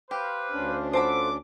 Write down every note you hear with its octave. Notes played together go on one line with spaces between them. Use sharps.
G4 B4 C5 F5 D6
D2 C#4 D4
F4 A4 C5 F#5 A5 B5 D6